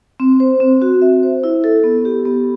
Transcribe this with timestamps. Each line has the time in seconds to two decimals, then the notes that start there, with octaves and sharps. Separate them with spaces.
0.20 C4
0.40 C5
0.60 C4
0.82 F#4
1.02 E5
1.23 C5
1.44 E4
1.64 A4
1.84 B3
2.05 G4
2.26 B3